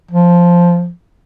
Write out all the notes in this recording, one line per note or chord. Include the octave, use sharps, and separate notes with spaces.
F3